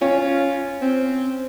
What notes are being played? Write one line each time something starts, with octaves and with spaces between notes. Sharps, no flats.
C#4 F4
C4